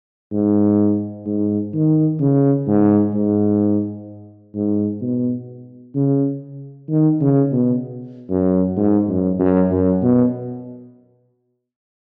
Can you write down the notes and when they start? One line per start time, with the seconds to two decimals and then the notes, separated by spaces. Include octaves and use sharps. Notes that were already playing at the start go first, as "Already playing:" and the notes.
0.32 G#2
1.26 G#2
1.74 D#3
2.20 C#3
2.67 G#2
3.14 G#2
4.55 G#2
5.01 B2
5.95 C#3
6.89 D#3
7.21 C#3
7.52 B2
8.30 F#2
8.77 G#2
9.08 F#2
9.39 F#2
9.71 F#2
10.02 B2